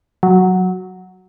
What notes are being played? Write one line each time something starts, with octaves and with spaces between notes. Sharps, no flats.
F#3